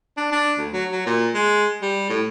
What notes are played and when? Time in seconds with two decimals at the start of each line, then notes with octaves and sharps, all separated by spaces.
0.17 D4
0.32 D4
0.58 D2
0.73 F#3
0.92 F#3
1.06 A#2
1.34 G#3
1.82 G3
2.10 A2